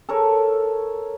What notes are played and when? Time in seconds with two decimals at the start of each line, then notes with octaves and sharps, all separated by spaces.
0.09 A4 A#4 C#5